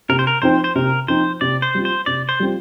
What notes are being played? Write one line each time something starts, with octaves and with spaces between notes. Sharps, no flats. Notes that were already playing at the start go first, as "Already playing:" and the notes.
C3 A#4
C5
A#4
F3 C4 D#4 C5
C5
C3 A#4
F3 C4 D#4 C5
C3 D5
C5
G3 C4 F4
C5
C3 D5
C5
G3 C4 F4